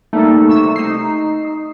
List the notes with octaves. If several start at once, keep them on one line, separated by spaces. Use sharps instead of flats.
G3 A3 A#3 D#4 A4 E6
C3 C#6 E6
D#4 C7
D#6